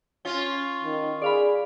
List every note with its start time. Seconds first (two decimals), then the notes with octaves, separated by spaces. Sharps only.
0.25 C#4 F4 G7
0.84 D#3
1.22 G#4 D5 F5 B5